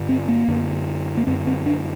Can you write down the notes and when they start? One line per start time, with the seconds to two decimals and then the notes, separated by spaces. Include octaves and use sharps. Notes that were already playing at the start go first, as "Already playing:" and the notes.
Already playing: G2 D3
0.09 C4
0.28 A#3
0.48 F#2 D3
1.17 A#3
1.26 F#2 D3 C4
1.47 C4
1.66 D4